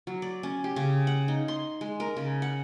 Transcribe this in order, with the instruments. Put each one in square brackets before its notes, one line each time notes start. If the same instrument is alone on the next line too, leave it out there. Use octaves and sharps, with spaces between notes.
[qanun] F#3
D5
C#4
G4
C#3
F#5
D#4
C6
G#3
A#4
C#3
F#5